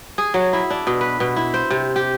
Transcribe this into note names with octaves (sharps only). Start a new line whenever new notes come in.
G#4
F#3
E4
D4
B2
B4
B2
E4
C5
C3
G4